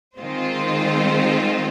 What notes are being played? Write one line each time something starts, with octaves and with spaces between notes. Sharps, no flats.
D#3 G#3 C4 F4 C5